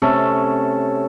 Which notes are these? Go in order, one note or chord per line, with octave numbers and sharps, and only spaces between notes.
C3 A3 C#4 A4